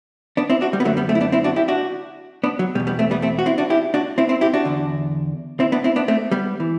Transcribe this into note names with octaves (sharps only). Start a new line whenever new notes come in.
B3 D4
C4 E4
D4 F#4
G3
B3
F#2 D3 F#3 A3
G3 B3
A3 C4
E4
B3 D4
C4 E4
D4 F#4
E4 G4
D4 F#4
B3 D4
F#3
E2 B2 G3
G3 B3
A3 C4
G3 B3
A3 C4
F#4
C4 E4
D4 F#4
E4 G4
D4 F#4
C4 E4
C4 E4
E4 G4
D4 F#4
E2 D3
C4 E4
B3 D4
C4 E4
B3 D4
A3 C4
G3 B3
E3